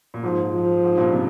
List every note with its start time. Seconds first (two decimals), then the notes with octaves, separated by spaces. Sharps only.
0.14 A#2
0.23 G#2 F3
0.53 F3
0.84 G#2
0.97 G2 A#2
1.13 C3